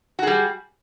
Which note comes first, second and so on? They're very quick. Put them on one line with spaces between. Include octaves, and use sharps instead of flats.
F#4 G#4 G3